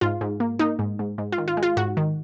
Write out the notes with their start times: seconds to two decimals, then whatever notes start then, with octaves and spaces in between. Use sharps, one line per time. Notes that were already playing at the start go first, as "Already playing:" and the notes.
0.01 G#2 F4
0.21 G#2
0.40 A#3
0.59 A#3 D#4
0.79 G#2
0.99 G#2
1.18 G#2
1.32 F4
1.38 D#3
1.48 F4
1.57 G#3
1.63 F4
1.77 G#2 F#4
1.97 D#3